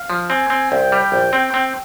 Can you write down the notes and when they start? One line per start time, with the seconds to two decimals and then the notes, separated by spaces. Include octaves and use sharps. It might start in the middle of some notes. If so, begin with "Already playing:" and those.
Already playing: F5
0.10 F3
0.30 C4 G#5
0.50 C4
0.71 C2 G5
0.92 G3
1.12 A#1
1.33 C4
1.54 C4